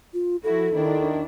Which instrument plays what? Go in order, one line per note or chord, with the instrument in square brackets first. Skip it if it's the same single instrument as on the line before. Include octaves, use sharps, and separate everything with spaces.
[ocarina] F4
[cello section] F3 E4 F#4 [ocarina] A4
[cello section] D#2 D4 E4 [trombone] D#3